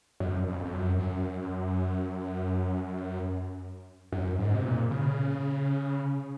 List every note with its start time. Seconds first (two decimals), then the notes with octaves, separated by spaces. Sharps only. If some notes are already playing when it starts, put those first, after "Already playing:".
0.20 F#2
0.47 F2
0.65 F2
0.73 F#2
0.99 F#2
4.12 F#2
4.39 G#2
4.55 C3
4.65 A#2
4.91 C#3